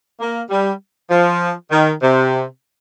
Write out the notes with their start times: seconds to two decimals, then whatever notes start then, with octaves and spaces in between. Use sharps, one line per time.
0.20 A#3
0.50 G3
1.11 F3
1.71 D#3
2.02 C3